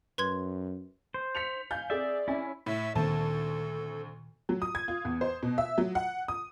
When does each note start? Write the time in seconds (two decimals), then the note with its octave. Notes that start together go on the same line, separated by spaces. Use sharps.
0.18 F#2 B4 C6 G#6
1.14 C5
1.35 B6 C#7 F7
1.71 F5 G#5 G6
1.90 C4 G#4 D5 E5
2.28 C#4 E4 G#5
2.66 A2 E5
2.95 D2 A#2 D#3 A#3 C4 A4 A5
4.49 F#3
4.62 D#6
4.75 G#6
4.88 F4
5.05 E2
5.21 C5
5.43 B2
5.58 E5
5.78 F#3
5.95 F#5
6.28 D#6